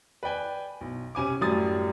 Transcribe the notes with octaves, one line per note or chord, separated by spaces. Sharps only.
B4 D5 G5 G#5
B1
C3 C#4 G#5 D6
F#2 A2 G3 G#5 D#6 A6